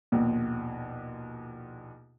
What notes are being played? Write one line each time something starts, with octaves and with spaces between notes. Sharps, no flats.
A#1 D#2 B2